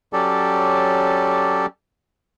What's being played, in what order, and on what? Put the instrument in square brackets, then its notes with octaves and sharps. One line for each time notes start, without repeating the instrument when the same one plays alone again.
[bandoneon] F#3 C#4 G4 A4 D5